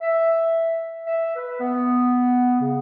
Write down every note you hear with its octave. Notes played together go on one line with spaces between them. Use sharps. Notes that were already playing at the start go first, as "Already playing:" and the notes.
E5
E5
B4
B3
C#3